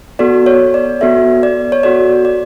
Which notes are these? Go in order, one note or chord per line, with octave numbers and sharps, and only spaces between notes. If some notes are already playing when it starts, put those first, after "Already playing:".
B3 F#4 A4 D5
C#5
D5
B3 F#4 A4 E5
D5
C#5
B3 F#4 A4 D5
D5